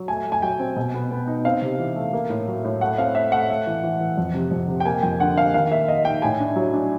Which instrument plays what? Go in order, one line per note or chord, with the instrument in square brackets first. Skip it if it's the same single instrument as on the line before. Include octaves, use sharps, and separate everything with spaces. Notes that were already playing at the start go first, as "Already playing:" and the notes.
Already playing: [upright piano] F#3
A3 G#5
A3
G#5
F#3 G5
C4
B2
B3
B3
D#4
C4 F5
C3
E3
A3
A#3
A2
F#3
A2
A3 F#5
C4 F5
A3 E5
A3 F#5
A3
E3
E3
E3
F2
C3
F2
C3
G5
A#3 G#5
F2 G5
D3 F#5
A#3 F5
D#3 F5
A#3 E5
D#4 D#5
D#4 G5
A2 G#5
D4
F#3
D4